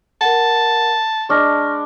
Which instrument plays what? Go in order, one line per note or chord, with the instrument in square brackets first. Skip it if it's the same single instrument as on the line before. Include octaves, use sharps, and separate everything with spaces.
[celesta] A#4 F#5 [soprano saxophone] A5
[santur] G#3 D4 [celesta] C#6 F6 A#6